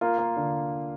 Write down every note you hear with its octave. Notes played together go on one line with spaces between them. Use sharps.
A#3 F4
A#3
D3